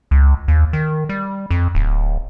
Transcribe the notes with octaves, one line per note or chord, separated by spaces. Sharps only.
C#2
D#2
D#3
G3
F2
D1